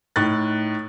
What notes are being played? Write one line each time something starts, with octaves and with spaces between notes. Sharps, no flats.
A2 D#4 F#6 A6